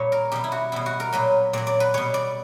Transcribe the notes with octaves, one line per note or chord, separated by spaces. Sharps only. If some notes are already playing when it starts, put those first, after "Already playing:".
Already playing: A#2 G3 C#5
A#4
B2 G3 G4
E4
F#4
B2 G3 E4
F#4
A#4
A#2 F#3 B4
A#2 F#3 D5
D5
B4
B2 G3 C#5
D5